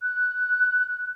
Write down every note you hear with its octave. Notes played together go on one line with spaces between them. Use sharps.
F#6